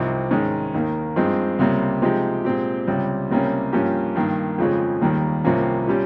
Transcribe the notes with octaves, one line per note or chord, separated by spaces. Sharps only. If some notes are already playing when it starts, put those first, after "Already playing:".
Already playing: C2 C3 F3 C4 D#4
G#2 D#3 G#3 C#4
D#2 D#3 A#3
G2 F3 G#3 C4 D#4
C#2 C3 G3 A#3
C3 F3 G#3 D#4 G4
A#2 G#3 C4 G4
C#2 C3 G3
C#2 C3 G3 A#3 C#4
G2 F3 A#3 C#4 G4
G2 D#3 A#3
F2 C#3 F3 G#3
D#2 D#3 G3 A#3
C2 C3 F3 A#3 C#4
A#2 G3 C#4 G4